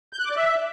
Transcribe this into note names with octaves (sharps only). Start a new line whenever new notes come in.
G6
F#6
D6
D5
E5